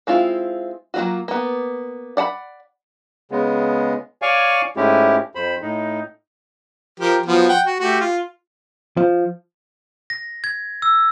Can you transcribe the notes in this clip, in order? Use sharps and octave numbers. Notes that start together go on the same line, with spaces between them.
G#3 C4 E4 F4
F#3 A#3 D4 F4 F#4
A#3 B3
D5 F#5 A5 B5
C#3 G#3 B3
C#5 D5 F5 G#5 C#6
G#2 G#3 A3 C#4 E4 G4
F2 C5 B5
A2 D#4
F3 G4 A#4
F3 F#3 B3
F#5 G5
F#4
A3 F#4 G4
F4
F3
A#6
G#6
E6